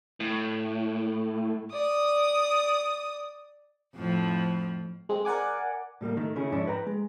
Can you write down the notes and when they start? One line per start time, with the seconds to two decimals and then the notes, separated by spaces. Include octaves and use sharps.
0.20 A2
1.73 D5 D#6
3.95 F2 A2 F3
5.09 G#3 C4
5.25 A#4 D5 F#5 G#5 D6
6.01 A2 G3 A3 A#3
6.17 D#3 A3
6.35 C#3 C#4 E4 G#4
6.52 F2 G#2 C#4 D4 E4
6.67 B4 G5 A#5
6.87 G#3